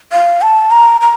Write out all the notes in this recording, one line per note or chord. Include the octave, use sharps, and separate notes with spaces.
F5
A5
A#5
A#5